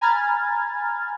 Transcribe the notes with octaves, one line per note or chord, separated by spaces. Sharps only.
G#5 A#5 B5 F6 G#6 A6